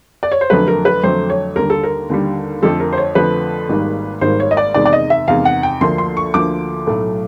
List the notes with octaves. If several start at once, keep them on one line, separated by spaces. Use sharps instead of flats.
D5
C#5
C5
F2 D3 F#3 A3 B4
A#4
B4
F2 D3 F#3 A3 C5
C#5
D#2 D3 G3 A#4
A4
A#4
D#2 D3 G3
F2 D3 F3 A3 A4
A#4
C5
C#5
F2 D3 F3 A3 B4
G#1 G#2 D#3 G3 A#3
G#1 G#2 D#3 G3 A#3 C5
C#5
D#5
D5
E2 C3 D#3 G#3 D5
D5
D#5
E5
E2 C3 D#3 G#3 F5
F#5
G5
D2 D3 F3 A#3 C6
C6
C#6
D2 D3 F3 A#3 D6
B1 A2 F#3 A3